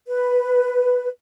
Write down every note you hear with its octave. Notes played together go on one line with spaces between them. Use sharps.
B4